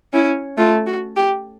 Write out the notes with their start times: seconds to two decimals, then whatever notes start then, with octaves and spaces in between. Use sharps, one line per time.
0.13 C#4 E4
0.57 A3 F4
0.86 F#4
1.16 G4